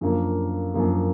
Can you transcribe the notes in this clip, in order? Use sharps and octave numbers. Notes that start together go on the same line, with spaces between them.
F#2 D3 F3 A#3
F#2 D3 F3 A#3